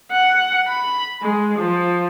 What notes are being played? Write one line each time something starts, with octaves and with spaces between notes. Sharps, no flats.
F#5
B5
G#3
F3